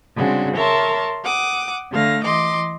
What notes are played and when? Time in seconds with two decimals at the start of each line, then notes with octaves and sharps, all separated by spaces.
0.16 C#3 G3 G#3 C4 D4 F#4
0.55 A#4 C#5 E5 A5 C6
1.23 F#5 D6 D#6
1.91 D3 A3 F5 A#6
2.23 E3 D#5 C6 D6